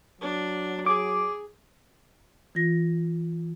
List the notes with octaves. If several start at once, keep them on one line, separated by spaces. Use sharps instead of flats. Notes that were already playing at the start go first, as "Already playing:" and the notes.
F#3 D4
G#4 D6
E3 F4 A#6